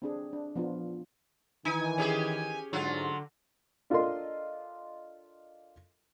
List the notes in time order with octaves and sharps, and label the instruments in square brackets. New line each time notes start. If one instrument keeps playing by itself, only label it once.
[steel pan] C4 D4 G#4
D4
F3 B3 D4 F4
[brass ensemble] D#3 E3 [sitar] D#4 [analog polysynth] G#5
[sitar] C#4 G4 G#4
[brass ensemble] G#2 [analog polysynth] D3 [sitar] F#3 F4
[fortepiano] D4 F4 A4 A#4 D#5 C6